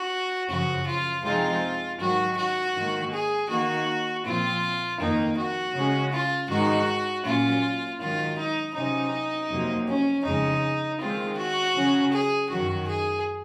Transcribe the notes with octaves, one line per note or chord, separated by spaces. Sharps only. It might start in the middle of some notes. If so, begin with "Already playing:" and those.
Already playing: F#4
F#2 C#3 F3 F#4
F4
C3 F3 G#3 C4 D#4 F4
G#2 D#3 F#3 F#4
F#4
G#2 D#3 A#3
G#4
D#3 A#3 D#4 F#4
A#2 F3 C4 F4
F2 D#3 A#3 D#4
F#4
C#3 G#3 C#4
F4
G#2 D#3 G#3 D#4 F#4
A#2 F#3 C#4 F4
G#2 D#3 F#3 F4
D#4
C3 F#3 C#4 D#4
F2 C3 F#3 A#3
C#4
F2 C#3 G#3 D#4
D#3 G#3 C4 F4
F#4
C#3 F#3 C#4
G#4
F#2 D#3 F#3 F#4
G#4